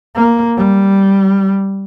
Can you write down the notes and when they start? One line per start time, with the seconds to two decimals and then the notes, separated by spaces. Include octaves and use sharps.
0.16 A#3
0.57 G3